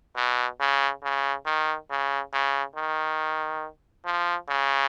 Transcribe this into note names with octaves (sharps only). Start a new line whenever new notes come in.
B2
C#3
C#3
D#3
C#3
C#3
D#3
F3
C#3